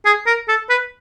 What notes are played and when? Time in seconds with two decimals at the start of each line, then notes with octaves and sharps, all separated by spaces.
0.05 G#4
0.27 A#4
0.48 A4
0.70 B4